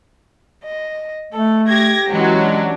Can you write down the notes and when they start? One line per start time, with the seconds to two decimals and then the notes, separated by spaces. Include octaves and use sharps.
0.64 D#5
1.33 A3 A4
1.67 G4 G#6 A#6
2.08 E3 F#3 G#3 C#4
2.39 D4